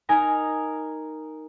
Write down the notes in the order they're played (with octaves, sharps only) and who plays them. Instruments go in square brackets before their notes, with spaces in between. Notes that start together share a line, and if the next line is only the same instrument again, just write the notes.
[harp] D#4 A#4 G#5 A#5